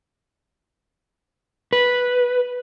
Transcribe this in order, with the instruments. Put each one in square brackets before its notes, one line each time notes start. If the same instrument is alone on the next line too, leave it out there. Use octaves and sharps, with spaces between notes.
[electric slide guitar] B4